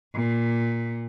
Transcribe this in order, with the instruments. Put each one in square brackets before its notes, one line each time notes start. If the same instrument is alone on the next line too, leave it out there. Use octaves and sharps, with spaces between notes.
[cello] A#2